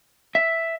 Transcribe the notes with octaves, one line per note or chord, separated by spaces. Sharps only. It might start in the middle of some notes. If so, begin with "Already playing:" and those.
E5